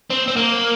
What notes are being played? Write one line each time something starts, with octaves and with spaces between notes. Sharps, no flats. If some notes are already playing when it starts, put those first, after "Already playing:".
C4
C4
A#3